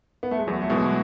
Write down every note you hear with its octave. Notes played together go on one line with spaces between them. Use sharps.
B3
A3
G#3
E2 F#3
A3
B2 E3 G#3
F#3